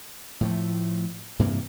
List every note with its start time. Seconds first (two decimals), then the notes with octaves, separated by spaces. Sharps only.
0.41 A2 F3 A3
1.39 G2 C3 E3 A#3